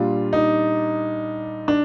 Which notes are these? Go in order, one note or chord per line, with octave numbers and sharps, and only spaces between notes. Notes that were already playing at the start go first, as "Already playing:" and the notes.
Already playing: A#2 G3 D4 F4
D#4
D4